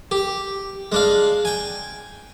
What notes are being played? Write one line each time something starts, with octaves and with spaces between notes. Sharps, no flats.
G4
G#3 D4 F5
G5 G#5